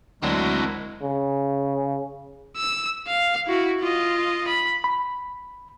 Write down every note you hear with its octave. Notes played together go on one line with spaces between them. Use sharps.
D2 F#3 G#3 C4 D4 E4 F#4 A#4
C#3
E6
F5
E4 F#4
F4 D#5
B5
B5